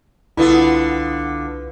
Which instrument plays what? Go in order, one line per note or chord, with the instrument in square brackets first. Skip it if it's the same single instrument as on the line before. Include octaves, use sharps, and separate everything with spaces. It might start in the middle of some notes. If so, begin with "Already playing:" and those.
[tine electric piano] C2 B4 [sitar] D3 B3 F4 [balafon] E4